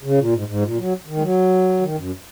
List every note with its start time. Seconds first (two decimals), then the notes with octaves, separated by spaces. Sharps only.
0.04 C#3
0.18 A#2
0.33 G#2
0.48 G#2
0.62 A#2
0.78 F#3
1.07 D#3
1.17 G#3
1.22 F#3
1.81 D#3
1.96 F#2